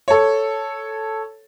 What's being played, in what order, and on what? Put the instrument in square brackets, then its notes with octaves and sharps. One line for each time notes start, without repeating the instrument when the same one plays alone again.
[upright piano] A4 C#5